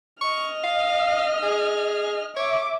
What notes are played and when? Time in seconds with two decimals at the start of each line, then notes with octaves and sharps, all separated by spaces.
0.21 D#5 C#6 F6
0.64 F5
1.43 G#4
2.36 C#5 E5 D6